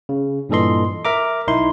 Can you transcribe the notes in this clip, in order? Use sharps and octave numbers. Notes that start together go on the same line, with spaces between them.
C#3
G2 A#2 E3 A4 D#5 C6
A#4 E5 A#5 D6
B1 D#4 E4 C6